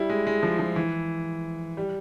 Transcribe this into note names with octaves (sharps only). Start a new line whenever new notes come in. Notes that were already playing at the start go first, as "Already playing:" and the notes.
Already playing: G3 E4
G#3
G#3
F3
F3
E3
G3